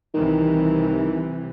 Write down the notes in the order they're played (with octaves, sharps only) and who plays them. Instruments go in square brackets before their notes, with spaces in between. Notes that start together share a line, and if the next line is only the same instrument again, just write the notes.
[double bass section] C2 C3 E3 [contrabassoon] D#3